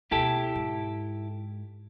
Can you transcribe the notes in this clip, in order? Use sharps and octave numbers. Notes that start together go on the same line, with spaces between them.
D2 B2 E4 G4 A4
G#2